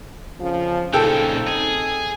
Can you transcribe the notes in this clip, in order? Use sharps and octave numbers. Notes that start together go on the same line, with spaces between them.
F2 C#3 F3
A#2 C#3 C4 D#4 A4 G5
G#4